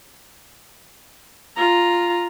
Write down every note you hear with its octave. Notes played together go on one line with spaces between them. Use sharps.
F4 A#5